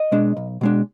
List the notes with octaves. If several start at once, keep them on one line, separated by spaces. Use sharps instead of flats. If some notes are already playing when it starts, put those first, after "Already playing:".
Already playing: D#5
B2 G#3 D4
B1
B2 G#3 D4